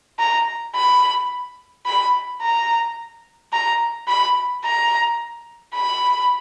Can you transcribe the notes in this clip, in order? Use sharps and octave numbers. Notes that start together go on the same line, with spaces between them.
A#5
B5
B5
A#5
A#5
B5
A#5
B5